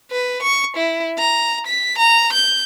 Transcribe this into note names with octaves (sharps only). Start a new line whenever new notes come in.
B4
C#6
E4
A#5
B6
A#5
G6